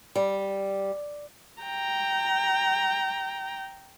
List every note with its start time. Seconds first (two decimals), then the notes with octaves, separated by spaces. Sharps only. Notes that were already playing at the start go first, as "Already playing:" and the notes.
0.16 G3
1.62 G5 A#5